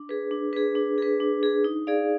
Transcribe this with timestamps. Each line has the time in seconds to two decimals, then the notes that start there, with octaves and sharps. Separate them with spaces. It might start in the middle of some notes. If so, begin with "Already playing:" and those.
Already playing: D4
0.09 G#4 B4
0.31 D4
0.53 G#4 B4
0.75 D4
0.98 G#4 B4
1.20 D4
1.43 G#4 B4
1.64 D#4
1.87 G#4 D5 F5